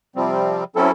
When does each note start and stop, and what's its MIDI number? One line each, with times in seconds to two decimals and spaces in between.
0.16 0.64 48
0.16 0.64 53
0.16 0.64 55
0.16 0.64 60
0.76 0.91 54
0.76 0.91 60
0.76 0.91 61
0.76 0.91 64
0.76 0.91 69